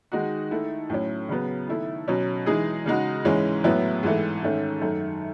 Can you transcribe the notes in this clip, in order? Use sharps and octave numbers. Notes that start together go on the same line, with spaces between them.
D#3 G#3 D#4 F#4
D#3 A3 E4
A2 F#3 C#4
C#3 F#3 B3
D#3 A3 E4
B2 F#3 C#4
E3 G#3 D#4 G#4
C#3 G#3 D#4 F#4
G#2 E3 G#3 C#4
A2 F#3 B3 E4
G#2 E3 A3
G#2 D#3 A3 C#4
F#2 D#3 A3